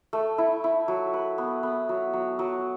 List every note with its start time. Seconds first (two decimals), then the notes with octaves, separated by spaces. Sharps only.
0.13 A3
0.38 E4
0.64 E4
0.88 F#3
1.14 B4
1.38 B3
1.63 B3
1.89 F#3
2.13 F#3
2.39 F#3